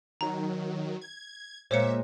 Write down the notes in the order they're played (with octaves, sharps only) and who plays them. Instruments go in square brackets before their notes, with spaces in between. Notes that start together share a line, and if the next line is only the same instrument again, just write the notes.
[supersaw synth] D#3 F#3 [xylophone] A#5
[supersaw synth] G#6
[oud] A#2 G#3 A#3 [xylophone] C5 C#5 C#7 [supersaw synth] E5